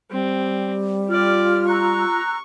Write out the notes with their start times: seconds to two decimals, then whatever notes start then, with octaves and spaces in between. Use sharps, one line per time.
0.11 G3 C4
1.08 F4 G4 D5 F6
1.68 A#5 C#6 E6 F#6